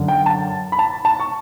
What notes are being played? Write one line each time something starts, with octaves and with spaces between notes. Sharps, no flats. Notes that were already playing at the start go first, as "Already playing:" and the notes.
Already playing: F#2 D3
G5
A5
B5
A5
A5
C#6